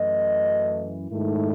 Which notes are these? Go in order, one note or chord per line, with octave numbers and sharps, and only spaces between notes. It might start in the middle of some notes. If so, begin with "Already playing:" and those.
Already playing: F#2 E3 A3 D#5
G#2 D#3 A3 E4